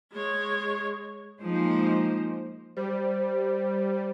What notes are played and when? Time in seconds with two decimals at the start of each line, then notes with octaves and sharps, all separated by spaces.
0.13 G#3 C#5
1.41 F3 G#3 A#3 D#4 C5
2.77 G3 C5